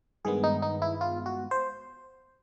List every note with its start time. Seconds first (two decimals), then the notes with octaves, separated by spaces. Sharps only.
0.25 G2 D#3 G#3 B3 G#4
0.44 D#4
0.62 D#4
0.82 E4
1.01 F4
1.26 F#4
1.51 C5